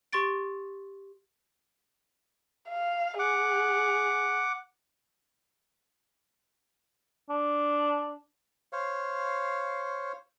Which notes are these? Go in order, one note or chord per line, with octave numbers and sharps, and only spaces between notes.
G4 C6 C#6 A6 D7
F5
G#4 F#5 D6
D4
C5 C#5 F5